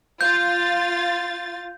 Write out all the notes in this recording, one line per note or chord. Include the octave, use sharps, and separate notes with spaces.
F4 G6 A6